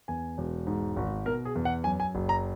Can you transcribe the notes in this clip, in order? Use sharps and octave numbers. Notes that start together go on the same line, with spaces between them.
E2 G#5
E1
G#2
G#1
B2 A#4
G#4
E2
F#5
F#2 G#5
G#5
F#1
A#5